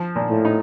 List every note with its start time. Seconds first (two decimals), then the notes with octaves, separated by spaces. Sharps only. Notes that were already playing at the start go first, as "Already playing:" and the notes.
Already playing: F3
0.16 A#2
0.30 A2
0.45 D#4